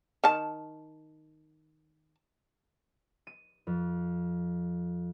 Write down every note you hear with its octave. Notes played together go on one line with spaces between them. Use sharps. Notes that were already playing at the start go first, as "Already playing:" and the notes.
D#3 A5
D#7
F2